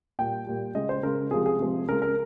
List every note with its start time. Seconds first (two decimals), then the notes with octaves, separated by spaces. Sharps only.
0.19 A#2 G3 G5
0.47 A#2 G3
0.75 C#3 G#3 D#5
0.89 C5
1.03 C#3 G#3 A#4
1.31 C3 F3 G#3 G#4
1.46 G#4
1.60 C3 F3 G#3
1.88 C#3 G#3 A#4
2.02 A#4